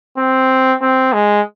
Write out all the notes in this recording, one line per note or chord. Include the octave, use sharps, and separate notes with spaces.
C4
C4
G#3